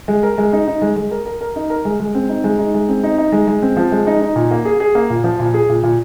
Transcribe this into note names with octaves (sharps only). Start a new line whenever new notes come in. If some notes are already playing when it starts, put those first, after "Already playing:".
G#3
A#4
G#3
D#4
D#4
G#3
G#3
A#4
A#4
A#4
D#4
A#4
G#3
G#3
C4
D#4
G#3
D#4
G#3
C4
D#4
D#4
G#3
G#3
C4
F3
G#3
D#4
D#4
A#2
A#3
G#4
G#4
A#3
A#2
F3
A#2
G#4
A#2
A#2